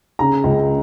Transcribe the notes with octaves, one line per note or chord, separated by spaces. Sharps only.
C#3 A#5
C#2